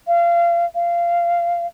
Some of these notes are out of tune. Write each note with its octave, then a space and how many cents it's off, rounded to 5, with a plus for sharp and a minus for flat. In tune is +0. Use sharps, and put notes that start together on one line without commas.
F5 -30
F5 -20